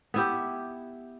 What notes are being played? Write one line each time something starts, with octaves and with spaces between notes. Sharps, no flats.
B3 E4 G4